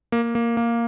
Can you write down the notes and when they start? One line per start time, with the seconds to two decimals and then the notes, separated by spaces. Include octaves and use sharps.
0.12 A#3
0.35 A#3
0.57 A#3